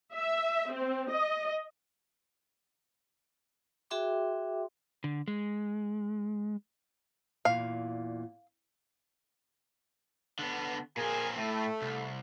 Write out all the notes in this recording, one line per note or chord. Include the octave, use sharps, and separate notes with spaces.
E5
C4
D#5
F#4 G#4 E5 G5 C6 D6
D3
G#3
E2 A#2 F5
D3 B3
A#2 C4 G#4 A#4 G#5
A2 A3
C2